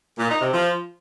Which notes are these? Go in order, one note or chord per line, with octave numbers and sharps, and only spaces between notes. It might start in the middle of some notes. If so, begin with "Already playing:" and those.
A#2
D#4
C3
F3